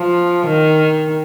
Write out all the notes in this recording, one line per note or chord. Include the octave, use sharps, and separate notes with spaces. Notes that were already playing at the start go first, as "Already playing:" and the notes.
Already playing: F3
D#3